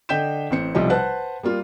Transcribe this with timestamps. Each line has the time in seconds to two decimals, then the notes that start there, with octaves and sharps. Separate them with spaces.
0.09 D3 D#5 G5 G6 B6 E7
0.51 A1 C4 C#7
0.75 B1 C3 F3 G3 D#5
0.90 B4 C5 F#5 A5 F#6
1.43 G3 A#3 F4